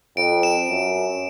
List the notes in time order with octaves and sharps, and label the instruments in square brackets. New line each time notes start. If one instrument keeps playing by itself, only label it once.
[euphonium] F2 [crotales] D7
[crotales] E7
[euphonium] F#2